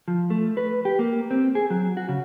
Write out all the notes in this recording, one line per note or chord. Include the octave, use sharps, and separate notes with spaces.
F3
A3
B4
G4
A#3
C4
G#4
F#3
F#4
C#3